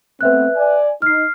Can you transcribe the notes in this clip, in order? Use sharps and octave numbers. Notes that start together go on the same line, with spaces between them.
A3 B3 C4 B4 E5 F#6
D5 G#5
D#4 F6 C7